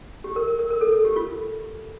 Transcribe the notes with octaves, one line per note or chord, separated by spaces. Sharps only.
G4
A#4
A#4
A#4
A#4
A4
A4
G4
F4